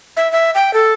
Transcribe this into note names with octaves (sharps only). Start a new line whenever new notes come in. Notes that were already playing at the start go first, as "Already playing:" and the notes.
E5
E5
G5
A4